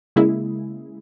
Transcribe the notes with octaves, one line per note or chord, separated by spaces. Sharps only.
C#3 G#3 A#3 E4 G#4